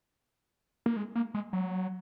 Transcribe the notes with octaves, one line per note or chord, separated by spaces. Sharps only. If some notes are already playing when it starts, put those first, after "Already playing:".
A#3
G#3
A#3
G#3
F#3